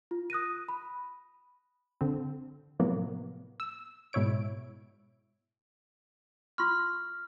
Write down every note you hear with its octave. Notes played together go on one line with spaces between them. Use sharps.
F4
D#6 F#6 A#6 D#7
B5
D3 C4
A2 C3 F3 F#3 A#3 B3
E6
G#2 B2 E4 C#5 D7
F4 C6 C#6 F6